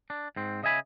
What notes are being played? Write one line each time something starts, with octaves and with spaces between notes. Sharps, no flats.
D4
G#2 C4
C#3 D#5 E5 G#5 B5